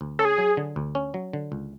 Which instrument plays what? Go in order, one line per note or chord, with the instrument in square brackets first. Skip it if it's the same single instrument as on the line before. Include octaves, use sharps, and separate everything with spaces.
[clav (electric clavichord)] D2
[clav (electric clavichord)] C#4 [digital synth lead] A4
[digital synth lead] G#4
[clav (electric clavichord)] F#3
D3
D2
C#4
F#3
D3
C#2